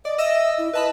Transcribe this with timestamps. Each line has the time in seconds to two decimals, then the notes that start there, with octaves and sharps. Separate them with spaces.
0.05 D5 D#5
0.18 D#5 E5 E6 A#6
0.58 E4
0.73 B4 D#5 A5 B5